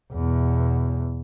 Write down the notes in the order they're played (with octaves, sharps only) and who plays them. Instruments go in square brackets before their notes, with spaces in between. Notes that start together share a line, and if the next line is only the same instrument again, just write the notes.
[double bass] E2 B2